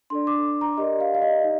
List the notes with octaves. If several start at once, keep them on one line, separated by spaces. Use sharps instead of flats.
D4 A4 D5 C6
D6
A#5
G4 A#4 D5 D#5
F5
F5
D#5
D#4